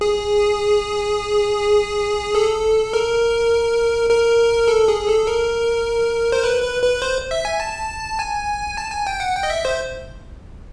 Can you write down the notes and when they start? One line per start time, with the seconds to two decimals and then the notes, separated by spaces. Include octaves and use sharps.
0.01 G#4
2.35 A4
2.93 A#4
4.10 A#4
4.68 A4
4.88 G#4
5.08 A4
5.27 A#4
6.32 C5
6.43 B4
6.62 B4
6.83 B4
7.02 C5
7.31 E5
7.45 G#5
7.60 A5
8.19 G#5
8.77 A5
8.92 G#5
9.07 G5
9.20 F#5
9.36 G5
9.43 D#5
9.50 E5
9.65 C5